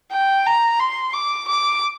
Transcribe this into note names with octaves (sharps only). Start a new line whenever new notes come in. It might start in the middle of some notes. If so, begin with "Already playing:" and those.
G5
A#5
C6
D6
D6